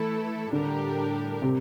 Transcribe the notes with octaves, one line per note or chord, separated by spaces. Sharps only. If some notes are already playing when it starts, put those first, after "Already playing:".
Already playing: E3 A3 E4 A4
A2 D3 G3 D4 G4 A#4
C3